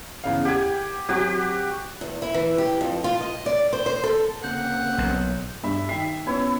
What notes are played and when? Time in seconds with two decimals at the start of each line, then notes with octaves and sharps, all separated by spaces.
0.24 E2 C#3 F5
0.45 G4 F#5 G#5
1.09 F#3 C4 F#4 G4
2.01 E2
2.22 E4
2.34 E3
2.58 G4
2.81 F2
3.04 F4
3.20 D#5
3.46 D5
3.73 C5
3.86 C5
4.04 A4
4.44 C#3 A#3 C4 F#5 G6
4.98 B1
5.64 G2 E5 B5
5.89 D#3 E5 G5 C7
6.27 B3 C#4 E4 C#5